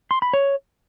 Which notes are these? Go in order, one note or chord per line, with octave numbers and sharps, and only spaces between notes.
C6
B5
C#5